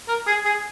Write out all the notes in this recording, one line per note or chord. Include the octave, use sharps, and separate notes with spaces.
A#4
G#4
G#4